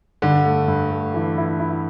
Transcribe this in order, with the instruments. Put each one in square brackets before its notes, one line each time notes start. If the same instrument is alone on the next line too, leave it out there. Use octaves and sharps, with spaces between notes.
[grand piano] G2 [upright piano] D3
[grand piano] A3
G2
A3
E3
E4
E4